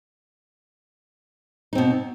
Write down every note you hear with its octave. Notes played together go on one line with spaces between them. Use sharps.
B2 C4 D#4